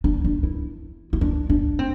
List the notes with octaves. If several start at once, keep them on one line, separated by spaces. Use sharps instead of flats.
D4
D4
E4
E4
D4
D4
C4